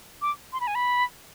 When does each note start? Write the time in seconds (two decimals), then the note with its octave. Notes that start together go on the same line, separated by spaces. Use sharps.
0.22 D6
0.53 C6
0.61 B5
0.67 G#5
0.75 B5